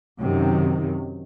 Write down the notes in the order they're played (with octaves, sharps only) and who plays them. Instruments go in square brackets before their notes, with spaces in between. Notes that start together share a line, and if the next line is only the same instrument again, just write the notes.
[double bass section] F#2 C3 D#3